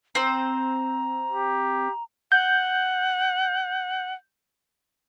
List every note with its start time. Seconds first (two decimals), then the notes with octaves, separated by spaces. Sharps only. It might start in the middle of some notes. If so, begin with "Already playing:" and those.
0.15 C4 C5 A#5
1.31 G4
2.32 F#5 G6